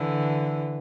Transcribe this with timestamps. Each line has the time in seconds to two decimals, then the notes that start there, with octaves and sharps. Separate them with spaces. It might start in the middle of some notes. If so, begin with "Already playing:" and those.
Already playing: D3 E3